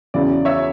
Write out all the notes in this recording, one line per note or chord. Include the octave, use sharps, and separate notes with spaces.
E2 C#3 F#3 C#4 E4 D5
C#5 E5